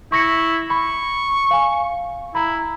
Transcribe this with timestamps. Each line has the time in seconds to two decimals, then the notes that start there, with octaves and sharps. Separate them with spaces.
0.12 E4 C#6 A#6 C#7
0.70 B5 C#6
1.51 F5 G#5
2.35 E4 A#5 B5